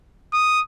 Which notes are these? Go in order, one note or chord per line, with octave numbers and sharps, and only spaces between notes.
D#6